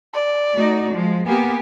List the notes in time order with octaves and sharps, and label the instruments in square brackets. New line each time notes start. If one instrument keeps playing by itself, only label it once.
[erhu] D5
[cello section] A3 D#4 F#4
F3 G#3
[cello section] A#3 B3 G4 [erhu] G#5